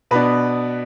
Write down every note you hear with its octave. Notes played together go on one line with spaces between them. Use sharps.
B2 B3 D4 B4